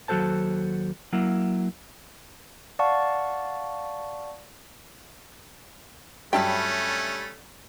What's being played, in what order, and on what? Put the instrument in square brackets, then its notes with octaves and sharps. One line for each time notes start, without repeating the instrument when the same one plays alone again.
[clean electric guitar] D#2 F#3 F#4 A4 C5 A5
F#3 A#3 E4
[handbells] D5 F5 F#5 A5 C#6
[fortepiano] G2 F#3 [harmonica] A3 C#4 [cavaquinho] E5 A5 B5 [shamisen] G5